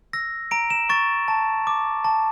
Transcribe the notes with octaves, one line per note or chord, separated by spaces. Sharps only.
E6 A#6
A#5 D7
E7
C#6 A6
A5
D6
A5